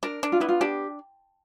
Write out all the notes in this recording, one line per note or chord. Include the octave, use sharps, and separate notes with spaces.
D4 A#4
D4
F4
B3 E4
F4
D4 G4